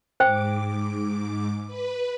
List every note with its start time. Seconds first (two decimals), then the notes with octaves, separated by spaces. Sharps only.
0.20 G#2 C5 G5 D6
1.67 B4